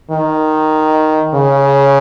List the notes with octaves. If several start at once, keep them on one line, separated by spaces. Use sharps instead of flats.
D#3
C#3